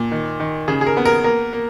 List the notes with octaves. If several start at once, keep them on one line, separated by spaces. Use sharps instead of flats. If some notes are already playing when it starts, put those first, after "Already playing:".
Already playing: A#2
D#3
D#3
C#3 G#4
G#4
A#4
B3
A#4
A#3 A#4
A#3